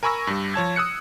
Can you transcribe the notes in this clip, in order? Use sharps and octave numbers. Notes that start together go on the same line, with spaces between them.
A#4 G#5 B5 C#6 E6 A#6
G2 G3
F3 C#5 A5 G#6
D#6 E6 F#6 C#7